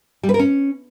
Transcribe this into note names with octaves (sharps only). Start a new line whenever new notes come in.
G3
B4
A#4
C#4